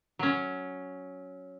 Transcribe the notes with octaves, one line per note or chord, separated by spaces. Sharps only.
F#3 C#4